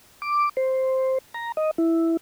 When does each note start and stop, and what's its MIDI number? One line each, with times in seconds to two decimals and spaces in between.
0.22 0.49 86
0.57 1.18 72
1.34 1.52 82
1.57 1.71 75
1.78 2.17 64